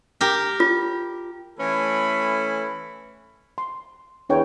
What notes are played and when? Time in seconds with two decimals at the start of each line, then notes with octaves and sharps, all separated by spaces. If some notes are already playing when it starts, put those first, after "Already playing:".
0.21 G4 A#4
0.60 F4
1.59 E3 A3 C#4 A4 B5
3.58 C6
4.30 E2 D4 C#5 G5